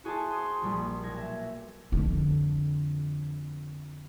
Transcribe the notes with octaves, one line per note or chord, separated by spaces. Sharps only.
E4 F#4 G#4 C5 F#5 A5
C6 D#6
A#1 A#2 G3 B5
B1 G#6 A#6
E5
F2 D3